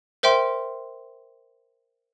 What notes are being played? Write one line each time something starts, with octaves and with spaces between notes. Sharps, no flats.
A#4 C5 E5 G5 C6